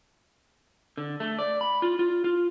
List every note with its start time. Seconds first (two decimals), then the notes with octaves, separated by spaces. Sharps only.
0.98 D3
1.20 A3
1.39 D5
1.61 B5
1.82 F4
1.99 F4
2.24 F4